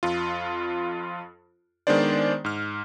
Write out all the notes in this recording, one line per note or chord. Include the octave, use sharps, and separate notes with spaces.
F2 F4
D#3 G#3 B3 D4 C5 D5
G#2 F6